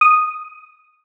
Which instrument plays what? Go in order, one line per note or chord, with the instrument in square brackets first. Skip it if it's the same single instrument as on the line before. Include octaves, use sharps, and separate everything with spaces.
[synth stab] D#6